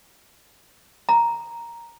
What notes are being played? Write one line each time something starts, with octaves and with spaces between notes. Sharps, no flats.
A#5